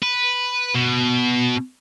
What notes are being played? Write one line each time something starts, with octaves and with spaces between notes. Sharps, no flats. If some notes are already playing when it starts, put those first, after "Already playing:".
B4
B2